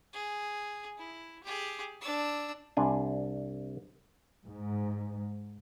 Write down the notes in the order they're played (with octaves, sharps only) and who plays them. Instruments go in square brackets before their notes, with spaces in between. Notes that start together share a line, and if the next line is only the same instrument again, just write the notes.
[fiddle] G#4
E4
G4 G#4
D4 E6
[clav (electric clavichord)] C2 C3 D4 G#5
[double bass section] G#2